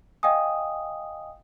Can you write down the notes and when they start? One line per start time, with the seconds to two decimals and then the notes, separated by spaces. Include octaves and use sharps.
0.23 D#5 F5 G5 G#5 D#6